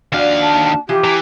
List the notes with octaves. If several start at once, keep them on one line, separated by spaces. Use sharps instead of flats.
D#2 F3 D4 F#4 F5
A5
E3 F3 F4 G4
E3 A#5